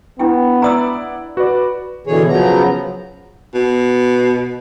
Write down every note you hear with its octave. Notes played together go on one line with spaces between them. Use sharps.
B3 D4 E4 G5
E4 D5 F#5 A#5 D#6 E6
F#4 B4 D5
B2 D3 E3 G#4 C#5
C#3 F3 F#3 B3 A#5
B2